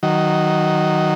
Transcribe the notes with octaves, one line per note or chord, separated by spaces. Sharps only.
D#3 F#3